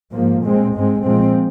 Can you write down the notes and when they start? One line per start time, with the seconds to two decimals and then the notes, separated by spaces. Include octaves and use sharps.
0.12 G#2 F3 A#3
0.42 A#2 G#3 C4
0.73 G#2 G#3 C4
1.03 A#2 F3 G#3 C4